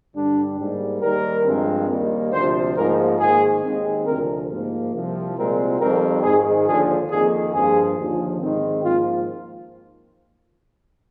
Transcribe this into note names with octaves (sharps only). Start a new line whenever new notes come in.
G2 D3 G3 D4
G#2 G3 A#3
D#2 D#3 G3 A#4
G2 F3 G#3 C4
D#2 D#3 G3 A#3
D2 C3 F3 C5
G#2 F3 A#3 A#4
G#2 D#3 A#3 G#4
D#2 D#3 G#3 C4
D2 C3 F3 A#4
G#2 F3 A#3
C2 C3 F3
C2 A#2 G#3 C4 A#4
F2 D#3 G3 C4 A#4
G#2 D#3 G#3 G#4
D#2 D3 F3 G#4
F2 D#3 A#3 G#4
G2 F3 A#3 G#4
D#2 D3 F3
G#2 D#3 G#3 C4
G#2 F3 A#3 F4